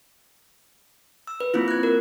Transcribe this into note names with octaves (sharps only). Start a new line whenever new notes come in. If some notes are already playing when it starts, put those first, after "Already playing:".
E6
B4
A#3 C4 E4 F4
F#6 G#6
A#4